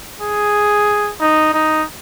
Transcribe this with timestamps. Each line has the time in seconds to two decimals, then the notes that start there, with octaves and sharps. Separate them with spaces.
0.21 G#4
1.20 D#4
1.54 D#4